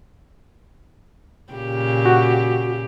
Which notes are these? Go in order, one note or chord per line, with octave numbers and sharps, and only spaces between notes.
A#2 C#3 G4
F#4